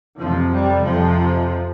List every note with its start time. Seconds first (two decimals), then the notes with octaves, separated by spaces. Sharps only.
0.18 F2 C3 F3
0.51 G3
0.82 F2 C3 F3